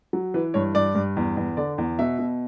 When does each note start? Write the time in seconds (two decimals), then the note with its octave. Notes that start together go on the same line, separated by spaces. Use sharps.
0.13 F#3
0.34 E3 B4
0.54 G2 C#5
0.74 G2 D5
0.95 G2
1.17 E2
1.37 E2
1.57 D3 D5
1.78 E2
1.99 B2 E5
2.19 B2